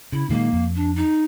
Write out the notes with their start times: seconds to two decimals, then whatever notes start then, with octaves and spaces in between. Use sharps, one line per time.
0.12 C#3 E4
0.29 A#2 D#3 G#3 A#3
0.53 F2
0.76 D4
0.96 D#4